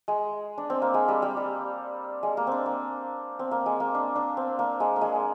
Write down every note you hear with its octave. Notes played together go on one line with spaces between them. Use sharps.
G#3
D4
C4
A#3
G#3
G3
G3
G3
G#3
A#3
C4 D4
A#3
C4
A#3
G#3
A#3
D4
D4
C4
A#3
G#3
A#3
G#3